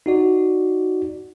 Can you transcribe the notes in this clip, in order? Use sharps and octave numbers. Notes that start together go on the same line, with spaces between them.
D#4 F#4 D5